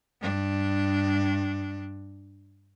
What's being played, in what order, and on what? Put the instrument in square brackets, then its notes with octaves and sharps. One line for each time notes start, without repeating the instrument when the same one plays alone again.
[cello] G2 D4